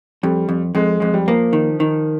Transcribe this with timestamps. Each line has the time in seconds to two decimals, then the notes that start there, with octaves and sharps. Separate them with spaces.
0.23 F2 G3
0.49 F2
0.75 F2 G#3
1.00 F2 G#3
1.14 G3
1.28 F3 A#3
1.53 D#3
1.80 D#3